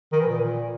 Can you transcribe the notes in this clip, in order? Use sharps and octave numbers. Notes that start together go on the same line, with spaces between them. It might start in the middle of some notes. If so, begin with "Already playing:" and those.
D#3
E3
A#2